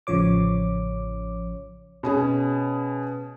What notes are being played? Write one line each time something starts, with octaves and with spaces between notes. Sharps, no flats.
A1 C#3 F3 C#5 D6
B2 C#4 G#4